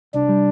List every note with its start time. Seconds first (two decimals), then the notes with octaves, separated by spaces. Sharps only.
0.14 C2 D4
0.29 G3